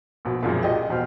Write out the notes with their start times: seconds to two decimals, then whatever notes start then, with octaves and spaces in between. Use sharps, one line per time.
0.25 A#1 B2
0.43 C2 F#2 A#2 F3 G#3
0.63 G4 G#4 D#5
0.89 E2 B2 C5 F6